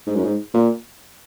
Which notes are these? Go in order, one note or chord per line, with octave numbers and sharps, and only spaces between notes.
G#2
F#2
G#2
A#2